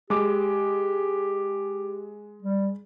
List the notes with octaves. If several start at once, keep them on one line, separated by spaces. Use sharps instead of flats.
G#3 G4 D6
G3